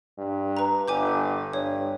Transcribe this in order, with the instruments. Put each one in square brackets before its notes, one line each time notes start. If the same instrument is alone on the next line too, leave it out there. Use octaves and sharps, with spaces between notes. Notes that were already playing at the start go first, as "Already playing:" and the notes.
[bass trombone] G2
[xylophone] B4 A#5
[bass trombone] G1 [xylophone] G#5 D6 G6
[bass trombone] G2 [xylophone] C#5